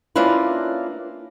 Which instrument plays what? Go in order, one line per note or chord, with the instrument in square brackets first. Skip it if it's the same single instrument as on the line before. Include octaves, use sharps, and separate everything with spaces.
[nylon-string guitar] A#3 C#4 D4 E4 F4 B4